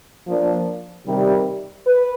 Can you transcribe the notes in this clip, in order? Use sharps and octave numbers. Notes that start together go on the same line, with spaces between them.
F3 A#3 D4
C3 D#3 G3
B4